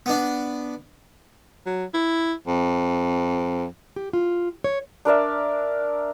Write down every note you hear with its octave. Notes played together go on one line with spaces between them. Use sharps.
B3 D4
F#3
E4
F2
G4
F4
C#5
D4 A#4 D5 E5